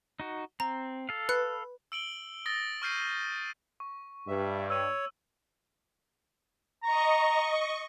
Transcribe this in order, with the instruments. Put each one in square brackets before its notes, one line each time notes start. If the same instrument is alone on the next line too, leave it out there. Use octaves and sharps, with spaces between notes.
[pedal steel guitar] D#4 F#4
[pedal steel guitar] C4 [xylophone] A#5
[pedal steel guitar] A4 F5
[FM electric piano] B4 [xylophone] F#6 C#7
[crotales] E6 D7 F#7 G7
D#6 A6 A#6 G7
C#6 F6 G6 C7 D#7
C#6
[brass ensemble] G2 [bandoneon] E5
[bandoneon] C#5 [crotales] E6 D#7
[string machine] D#5 C#6 [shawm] A#5